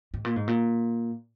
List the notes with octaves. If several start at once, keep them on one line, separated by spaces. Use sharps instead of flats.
G#2
A#2
G#2
A#2